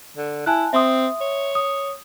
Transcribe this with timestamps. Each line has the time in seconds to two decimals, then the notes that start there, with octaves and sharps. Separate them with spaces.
0.17 D3
0.46 E4 G#5 A5 F#6
0.73 C4 E5 C6 D#6
1.21 C#5
1.55 D#6